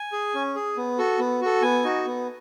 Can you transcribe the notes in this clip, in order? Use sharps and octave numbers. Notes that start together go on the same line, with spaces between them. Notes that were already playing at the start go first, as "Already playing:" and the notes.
Already playing: G#5
G#4
C#4
G#4
B3
F#4 A4
B3
F#4 A4
B3 G#5
D#4 F#4
B3